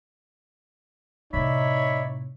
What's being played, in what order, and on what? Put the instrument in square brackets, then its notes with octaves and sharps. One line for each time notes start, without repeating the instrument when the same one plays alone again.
[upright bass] A2 C3 [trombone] D#4 [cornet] C#5 [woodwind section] D5 E5 B5